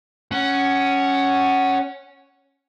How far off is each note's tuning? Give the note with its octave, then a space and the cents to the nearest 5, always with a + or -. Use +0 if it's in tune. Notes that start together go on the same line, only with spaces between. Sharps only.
C#4 +0 F#5 +15